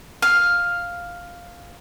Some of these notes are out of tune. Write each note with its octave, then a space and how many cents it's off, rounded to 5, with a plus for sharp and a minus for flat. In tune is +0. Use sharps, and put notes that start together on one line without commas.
F5 +5